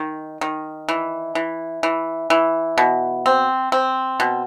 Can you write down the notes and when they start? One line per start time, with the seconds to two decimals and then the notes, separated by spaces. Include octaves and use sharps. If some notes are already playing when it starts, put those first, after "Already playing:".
Already playing: D#3
0.41 D#3
0.89 E3
1.35 E3
1.83 E3
2.30 E3
2.78 B2
3.26 C4
3.72 C4
4.20 B2